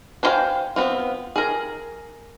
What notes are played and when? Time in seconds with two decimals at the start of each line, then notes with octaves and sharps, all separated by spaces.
0.23 D4 G#4 C5 F5 G5
0.76 B3 C4 F4
1.36 G#4 A#4